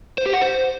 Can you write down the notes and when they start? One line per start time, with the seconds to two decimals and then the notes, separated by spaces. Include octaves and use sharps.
0.18 C5
0.26 G4
0.34 F#5
0.41 C5